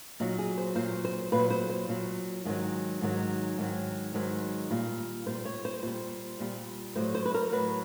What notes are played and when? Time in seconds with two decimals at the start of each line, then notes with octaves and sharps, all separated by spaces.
0.20 A#2 F#3 D#4
0.38 G#4
0.57 C5
0.75 A#2 F#3 C5
1.05 C5
1.32 A#2 F#3 B4
1.50 C5
1.70 C5
1.89 A#2 F#3
2.45 G#2 D#3 F#3
3.01 G#2 D#3 F#3
3.58 G#2 D#3 F#3
4.14 G#2 D#3 F#3
4.70 A#2 G3
5.27 A#2 G3 C5
5.45 C#5
5.65 C5
5.83 A#2 G3 C5
6.40 A#2 G3
6.96 A2 F#3 C5
7.15 C5
7.26 B4
7.34 A#4
7.52 A2 F#3 B4